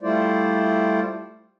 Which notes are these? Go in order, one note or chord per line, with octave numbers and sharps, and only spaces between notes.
G3 A3 E4 F4 C5 D5